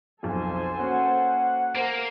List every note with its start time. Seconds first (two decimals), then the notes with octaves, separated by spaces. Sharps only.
0.23 B1 F2 A4 C5 G#5
0.79 A#3 C#4 F#4 F#5
1.75 A#3 A#4 C5